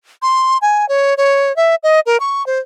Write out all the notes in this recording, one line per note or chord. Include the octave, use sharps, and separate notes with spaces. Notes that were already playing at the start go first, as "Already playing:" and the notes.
C6
G#5
C#5
C#5
E5
D#5
A#4
C#6
C5